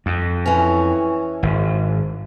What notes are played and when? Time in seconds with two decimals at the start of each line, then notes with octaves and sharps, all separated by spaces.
0.06 F2
0.46 E3 C#4
1.43 G#1